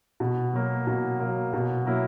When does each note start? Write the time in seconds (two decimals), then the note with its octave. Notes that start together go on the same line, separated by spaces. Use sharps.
0.20 B2
0.54 F#3 A#3
0.87 B2
1.19 F#3 A#3
1.53 B2
1.86 F#3 A#3 E4